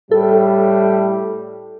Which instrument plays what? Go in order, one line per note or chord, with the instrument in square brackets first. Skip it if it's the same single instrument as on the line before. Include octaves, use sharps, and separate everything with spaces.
[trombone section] A2 G3 [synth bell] A4